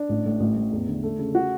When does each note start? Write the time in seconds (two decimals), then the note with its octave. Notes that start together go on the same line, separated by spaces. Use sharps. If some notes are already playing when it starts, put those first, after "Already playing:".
Already playing: D4
0.09 A1
0.25 A2
0.40 A1
0.56 A2
0.72 E2
0.88 D3
1.03 A3
1.19 C#3
1.35 A3 F#4